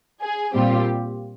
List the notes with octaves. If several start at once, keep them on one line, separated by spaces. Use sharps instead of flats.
G#4
A#2 G3 C4 F4 G4